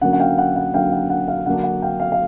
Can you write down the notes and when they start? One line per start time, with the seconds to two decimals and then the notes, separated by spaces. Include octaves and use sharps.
0.01 D3 F#3 A#3 C#4 F#5
0.13 F#5
0.20 F5 G5
0.38 F#5
0.56 F#5
0.74 D3 F#3 A#3 C#4 F5 G5
0.92 F#5
1.10 F#5
1.28 F5
1.46 D3 F#3 A#3 D4 F#5
1.64 F#5
1.82 F5 G5
2.00 F5
2.12 F5